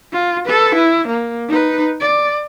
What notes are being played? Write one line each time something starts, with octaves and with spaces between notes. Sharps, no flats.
F4
A4 B4
E4
A#3
D#4 B4
D5